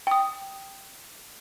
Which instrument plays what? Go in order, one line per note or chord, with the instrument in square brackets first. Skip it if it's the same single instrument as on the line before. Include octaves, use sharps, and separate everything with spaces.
[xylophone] G5 D#6